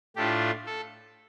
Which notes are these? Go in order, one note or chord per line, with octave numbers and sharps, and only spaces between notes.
A2 A3 D4 F4 G4
A4